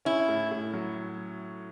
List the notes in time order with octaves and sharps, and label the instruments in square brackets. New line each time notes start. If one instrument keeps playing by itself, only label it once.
[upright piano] C#4 [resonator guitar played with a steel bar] E4
[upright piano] A2
A2
F#3